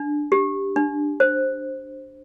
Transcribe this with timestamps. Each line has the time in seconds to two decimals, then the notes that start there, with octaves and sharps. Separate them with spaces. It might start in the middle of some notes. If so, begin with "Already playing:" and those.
Already playing: D4
0.32 G4
0.76 D4
1.20 C5